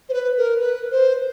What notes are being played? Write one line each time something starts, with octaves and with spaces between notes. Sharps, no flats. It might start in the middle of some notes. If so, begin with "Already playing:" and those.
C5
B4
A#4
B4
C5